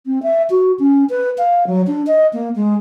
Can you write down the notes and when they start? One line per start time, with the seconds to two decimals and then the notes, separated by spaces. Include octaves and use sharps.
0.06 C4
0.23 E5
0.50 F#4
0.79 C#4
1.10 B4
1.38 F5
1.67 F#3
1.87 D4
2.07 D#5
2.33 A#3
2.56 G#3